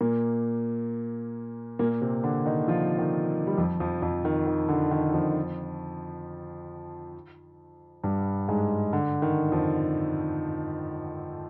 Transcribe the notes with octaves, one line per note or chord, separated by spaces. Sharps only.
A#2 A#3
A#2 A#3
C3 C4
D3 D4
D#3 D#4
F3 F4
D#3 D#4
G3
F2 F3
F2 F3
F2 F3
D#3
D#3
D3
D#3
F2 F3
G2 G3
G#2 G#3
D3
D#3
F2 F3